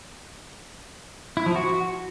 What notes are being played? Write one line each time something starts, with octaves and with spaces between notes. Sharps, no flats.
E4
F3
F#4